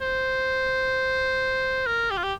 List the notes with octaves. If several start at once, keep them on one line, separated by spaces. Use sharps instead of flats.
C5
A#4
G4
F4
G4